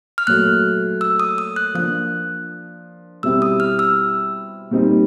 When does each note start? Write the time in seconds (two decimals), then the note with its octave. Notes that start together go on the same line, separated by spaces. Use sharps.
0.18 F6
0.27 A#2 F#3 A3 F#6
1.01 E6
1.20 D#6
1.38 D#6
1.56 F#6
1.75 F3 A#3 D4 F#6
3.23 B2 G3 C4 E4 G4 E6
3.42 D#6
3.60 F6
3.79 E6
4.71 A#2 G3 C4 D#4